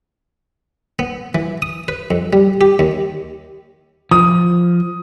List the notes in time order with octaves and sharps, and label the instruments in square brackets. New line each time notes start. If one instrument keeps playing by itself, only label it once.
[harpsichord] B3
E3
D#6
B4
F2
G3
G4
D#2
[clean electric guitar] F3 [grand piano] D#6